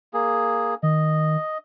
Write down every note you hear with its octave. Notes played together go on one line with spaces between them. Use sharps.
A#3 G#4
D#3 D#5